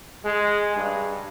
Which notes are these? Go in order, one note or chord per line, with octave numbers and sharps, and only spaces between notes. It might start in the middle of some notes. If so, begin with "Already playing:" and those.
G#3
G2